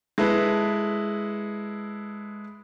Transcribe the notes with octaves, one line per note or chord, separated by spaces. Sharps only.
G#3 E4 A4 B4